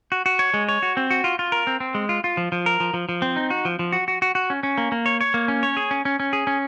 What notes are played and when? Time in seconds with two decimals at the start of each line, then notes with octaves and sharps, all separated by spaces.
0.12 F#4
0.26 F#4
0.39 C#5
0.54 G#3
0.69 C#5
0.83 F#4
0.97 C4
1.11 F#4
1.24 F4
1.39 F4
1.52 A#4
1.67 C4
1.80 C4
1.95 G#3
2.09 F4
2.24 F4
2.37 F3
2.52 F3
2.66 A#4
2.80 F3
2.94 F3
3.09 F3
3.22 C4
3.36 D#4
3.50 F#4
3.65 F3
3.79 F3
3.92 F#4
4.08 F#4
4.22 F#4
4.35 F#4
4.50 C#4
4.63 C#4
4.78 A#3
4.92 A#3
5.06 C#5
5.21 C#5
5.34 A#3
5.48 C#4
5.63 C#5
5.77 G#4
5.91 C#4
6.05 C#4
6.20 C#4
6.33 G#4
6.47 C#4